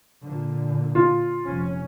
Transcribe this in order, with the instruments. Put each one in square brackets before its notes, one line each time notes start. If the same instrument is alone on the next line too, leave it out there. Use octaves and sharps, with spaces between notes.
[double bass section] A#2 D3
[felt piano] F4
[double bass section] F1 C#4